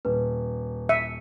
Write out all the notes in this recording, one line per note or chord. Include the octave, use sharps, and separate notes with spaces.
D#1 B4
E5 C#7 D#7